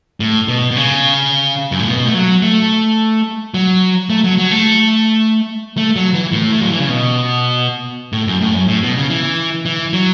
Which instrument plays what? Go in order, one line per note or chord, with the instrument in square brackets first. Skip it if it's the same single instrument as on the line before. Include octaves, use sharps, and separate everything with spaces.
[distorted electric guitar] A2
B2
B2
C#3
F#2
A2
B2
A3
F#3
A3
F#3
A3
F#3
F#3
A3
A3
F#3
E3
A2
A3
F#3
E3
C#3
B2
A2
F#2
A2
F#2
A2
B2
C#3
E3
E3
F#3